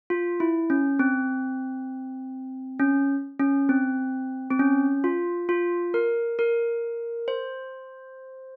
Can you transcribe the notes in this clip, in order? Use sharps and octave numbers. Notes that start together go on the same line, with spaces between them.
F4
E4
C#4
C4
C#4
C#4
C4
C4
C#4
F4
F4
A#4
A#4
C5